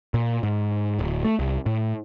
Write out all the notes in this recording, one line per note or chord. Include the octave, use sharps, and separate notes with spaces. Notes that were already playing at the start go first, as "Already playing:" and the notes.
A#2
G#2
D1
A3
C2
A2